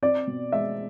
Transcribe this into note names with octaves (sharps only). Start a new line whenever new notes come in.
C4 D5
B2
G#3 E5